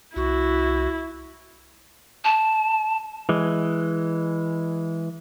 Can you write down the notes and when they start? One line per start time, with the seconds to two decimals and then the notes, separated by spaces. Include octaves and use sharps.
0.16 C2 E4 F#4
2.24 A5
3.29 E3 G#3